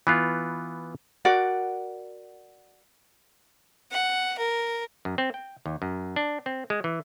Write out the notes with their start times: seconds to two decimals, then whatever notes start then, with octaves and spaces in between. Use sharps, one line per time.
0.07 E3 B3 F4
1.25 F#4 A#4 D5 F#5
3.92 F#5
4.38 A#4
5.05 F#2
5.18 C4
5.34 G5
5.66 D#2
5.82 F#2
6.16 D4
6.46 C4
6.70 G#3
6.84 E3